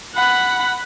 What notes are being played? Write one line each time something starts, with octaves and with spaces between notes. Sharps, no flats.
F#5 B5